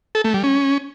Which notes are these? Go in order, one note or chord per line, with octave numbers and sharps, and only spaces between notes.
A4
A3
G3
C#4